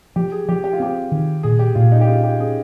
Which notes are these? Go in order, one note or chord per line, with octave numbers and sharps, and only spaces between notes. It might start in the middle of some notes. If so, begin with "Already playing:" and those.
F3 G4
G#4
F3 G4
G4
F4
C4 G4
D#3
A#2 G#4
G4
A#2 F4
D#4
G4
C#4 F4
G4
C#4 G#4